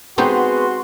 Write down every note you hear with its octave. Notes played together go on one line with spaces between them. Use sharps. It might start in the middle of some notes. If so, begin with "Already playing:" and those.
G#3 B3 C4 D#4 F#4 G#4 C6